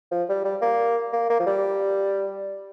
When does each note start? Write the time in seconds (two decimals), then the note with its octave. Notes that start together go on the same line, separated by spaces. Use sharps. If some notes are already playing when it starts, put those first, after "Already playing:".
0.12 F3
0.29 G3
0.45 G3
0.62 A#3
1.13 A#3
1.30 A#3
1.40 F3
1.46 G3